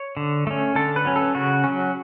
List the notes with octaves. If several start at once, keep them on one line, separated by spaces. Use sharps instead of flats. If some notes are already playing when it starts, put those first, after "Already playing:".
Already playing: C#5
D3
A3 C#4
D3 A4
B4
F#3 C#4
A4
C#3 F#4
F#3 C#4